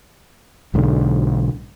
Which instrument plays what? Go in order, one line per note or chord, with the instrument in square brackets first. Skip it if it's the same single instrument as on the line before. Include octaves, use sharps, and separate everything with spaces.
[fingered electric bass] B1 G#2 D3